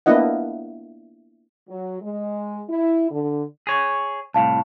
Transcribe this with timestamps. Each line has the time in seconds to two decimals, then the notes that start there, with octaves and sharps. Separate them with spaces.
0.06 A#3 B3 D4 E4 D#5 F#5
1.69 F#3
2.02 G#3
2.70 E4
3.11 D3
3.67 G#4 C#5
4.34 C2 A2 F5 A5